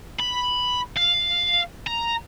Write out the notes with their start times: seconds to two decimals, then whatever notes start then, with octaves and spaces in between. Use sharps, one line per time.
0.19 B5
0.97 F5
1.87 A#5